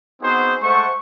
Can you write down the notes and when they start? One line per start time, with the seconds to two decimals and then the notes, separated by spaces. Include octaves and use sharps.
0.22 B3 C4 D#4 F#4 G#4 C5
0.62 G#3 A3 C5 F#5 C#6